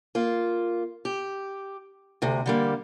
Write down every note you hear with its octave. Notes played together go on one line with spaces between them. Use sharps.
A#3 F4
G4
D2 C3
D3 G3 A#3